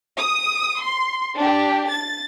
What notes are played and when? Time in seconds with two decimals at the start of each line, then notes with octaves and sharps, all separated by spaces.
0.18 D#6
0.79 C6
1.37 D4 G4
1.87 A6